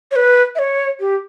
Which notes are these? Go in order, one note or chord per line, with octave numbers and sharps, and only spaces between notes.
C#5
B4
E5
C#5
G4